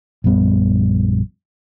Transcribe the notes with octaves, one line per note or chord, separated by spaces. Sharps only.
A#1 F#2 G3 B3